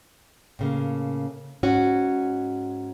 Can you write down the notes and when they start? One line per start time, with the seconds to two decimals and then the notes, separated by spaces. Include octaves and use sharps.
0.59 A2 C#3 A#3
1.63 G#2 C#4 F#4